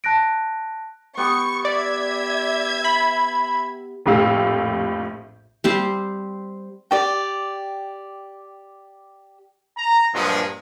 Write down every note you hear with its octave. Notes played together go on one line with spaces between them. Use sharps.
A5 F#6 A#6 D7
B3 G4 C#6
D5 E5 G#6
B5
A#1 F2 A2 G4 F5 E6
G3 C4 G4
G4 D5 G5
A#5
G2 A#2 F3 F#3 G#3